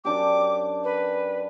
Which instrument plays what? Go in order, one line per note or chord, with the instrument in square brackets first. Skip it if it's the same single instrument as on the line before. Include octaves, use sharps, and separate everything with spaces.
[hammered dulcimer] F#2 D4 G4 [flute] D6
[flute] B4